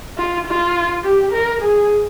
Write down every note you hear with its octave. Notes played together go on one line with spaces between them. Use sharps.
F4
F4
G4
A#4
G#4